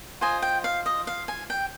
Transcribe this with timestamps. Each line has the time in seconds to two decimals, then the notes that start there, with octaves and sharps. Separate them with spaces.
0.21 F4 C5 D#5 G#5
0.42 G5
0.64 F5
0.86 D#5
1.07 F5
1.28 G#5
1.50 G5